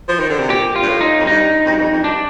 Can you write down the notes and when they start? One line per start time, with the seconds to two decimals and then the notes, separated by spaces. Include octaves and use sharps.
0.09 F3
0.19 D#3
0.30 D3
0.39 C3
0.49 A#2 G4
0.76 F4
0.82 G2
0.88 A2
1.01 D#4
1.19 F2
1.27 G2 D#4
1.65 F2
1.72 G2
1.80 F2
1.92 F2
2.03 G2 D4